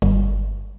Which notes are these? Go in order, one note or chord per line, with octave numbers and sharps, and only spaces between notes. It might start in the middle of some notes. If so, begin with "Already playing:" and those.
G1